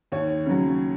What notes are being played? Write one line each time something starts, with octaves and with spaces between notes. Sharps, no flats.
D#2 C#5
C#3 F#3